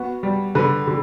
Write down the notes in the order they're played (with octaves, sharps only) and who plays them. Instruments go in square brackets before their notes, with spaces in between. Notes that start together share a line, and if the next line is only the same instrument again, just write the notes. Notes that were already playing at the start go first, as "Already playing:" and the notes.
Already playing: [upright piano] B3 F#4
G3
D3 B4
D3